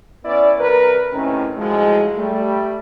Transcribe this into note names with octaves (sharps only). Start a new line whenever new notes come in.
B3 C#4 E4 D5
C2 A#4 B4
A2 C3 D#3 C#4
A2 F3 F#3 G#3
G3 A3